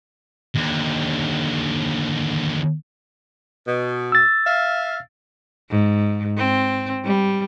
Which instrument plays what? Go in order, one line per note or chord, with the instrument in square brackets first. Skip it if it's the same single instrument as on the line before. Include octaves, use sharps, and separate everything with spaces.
[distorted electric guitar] D#2 D3
[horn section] B2
[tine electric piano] E6 A6
[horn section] E5 F5
[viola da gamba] G#2
C4
G3